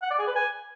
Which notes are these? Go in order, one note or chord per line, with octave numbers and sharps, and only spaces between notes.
F#5
D5
G#4
B4
G#5